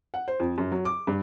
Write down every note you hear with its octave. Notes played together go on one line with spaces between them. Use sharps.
F#5
C5
F2
F#2
F#3
D6
G2